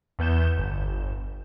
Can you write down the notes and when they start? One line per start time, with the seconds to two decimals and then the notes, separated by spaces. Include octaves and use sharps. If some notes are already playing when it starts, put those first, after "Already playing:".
0.19 E2 B3 G6 E7
0.58 G1